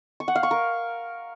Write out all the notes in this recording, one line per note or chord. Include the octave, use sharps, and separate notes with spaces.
C#6
F#5
F5
C#6
A#4